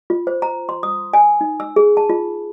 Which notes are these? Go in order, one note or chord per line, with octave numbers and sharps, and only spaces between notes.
F4
C5
A#5
C6
D#6
G#5
D#4
E6
G#4
A5
F4